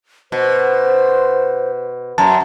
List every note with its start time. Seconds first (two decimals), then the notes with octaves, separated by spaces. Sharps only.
0.32 B2 C5
2.18 F#2 A5 A#5